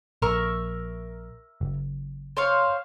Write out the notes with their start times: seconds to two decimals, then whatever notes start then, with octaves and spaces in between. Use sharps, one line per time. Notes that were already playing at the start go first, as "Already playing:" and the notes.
0.22 A#1 A#4 E5 C#6
1.61 F#1
2.37 C5 C#5 F5